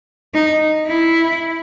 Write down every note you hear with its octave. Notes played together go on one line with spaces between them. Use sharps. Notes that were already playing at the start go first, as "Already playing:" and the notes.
D#4
E4